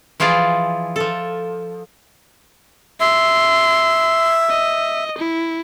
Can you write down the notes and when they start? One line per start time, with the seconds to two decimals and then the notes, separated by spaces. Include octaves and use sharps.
0.20 E3 F3 F4 G#4 D5
0.96 F3 A4
3.00 E5 C6
4.50 D#5
5.18 E4